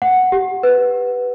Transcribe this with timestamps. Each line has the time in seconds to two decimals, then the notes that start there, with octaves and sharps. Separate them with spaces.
0.02 F#5
0.32 G4
0.63 B4